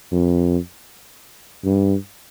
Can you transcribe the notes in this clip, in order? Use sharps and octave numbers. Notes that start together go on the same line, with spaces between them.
F2
G2